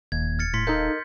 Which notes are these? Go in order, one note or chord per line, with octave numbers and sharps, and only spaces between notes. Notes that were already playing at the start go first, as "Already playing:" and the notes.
D#1 D#2 G#6
F6 A6 C#7
A2 C6 B6 C#7
D#4 A4 A#4 D#5 F5 G6